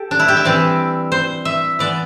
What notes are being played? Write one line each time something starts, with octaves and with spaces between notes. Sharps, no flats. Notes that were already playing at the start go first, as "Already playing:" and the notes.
Already playing: G4 A4
D4
E4
G4
E5
E3 G3 C4 D5
C5
E5
E3 B3 D5